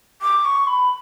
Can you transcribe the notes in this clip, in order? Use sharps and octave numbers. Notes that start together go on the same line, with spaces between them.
D6
C#6
B5